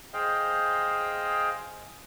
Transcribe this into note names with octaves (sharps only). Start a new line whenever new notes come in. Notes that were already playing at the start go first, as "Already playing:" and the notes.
G#4 C5 D#5 F5 G5